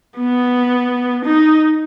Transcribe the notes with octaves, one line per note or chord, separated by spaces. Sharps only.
B3
D#4